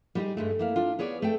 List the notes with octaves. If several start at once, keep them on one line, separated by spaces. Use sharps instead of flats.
G3 B3 D#4 E4 G4 G#4
G2 G#3 A3
A#3 E4 F5
D4 F4
B3 G#4 C#5 D5
A3 A4 G5